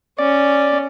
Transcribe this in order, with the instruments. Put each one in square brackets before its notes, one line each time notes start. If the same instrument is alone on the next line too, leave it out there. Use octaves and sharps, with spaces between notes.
[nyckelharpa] C#4 [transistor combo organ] D5